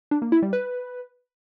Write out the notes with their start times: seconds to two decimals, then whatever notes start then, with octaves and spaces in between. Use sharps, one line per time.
0.11 D4
0.22 A#3
0.32 E4
0.42 G3
0.53 B4